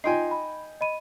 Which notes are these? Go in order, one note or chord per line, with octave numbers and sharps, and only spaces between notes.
D#4 F4 G5 G#5 C6 C7
B5
D#5 B5 D#7